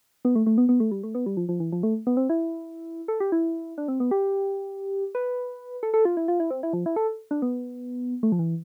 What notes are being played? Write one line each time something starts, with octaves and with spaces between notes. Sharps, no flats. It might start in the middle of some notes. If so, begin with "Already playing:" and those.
B3
A3
A3
B3
B3
A3
G3
A3
B3
G3
F3
F3
E3
F3
A3
B3
C4
E4
A4
G4
E4
D4
C4
B3
G4
B4
A4
A4
F4
E4
F4
E4
C4
E4
F3
E4
A4
D4
B3
A3
F3
E3